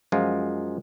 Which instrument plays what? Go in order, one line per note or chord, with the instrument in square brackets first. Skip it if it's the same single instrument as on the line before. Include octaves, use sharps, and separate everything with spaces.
[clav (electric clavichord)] F#2 F3 G#3 F4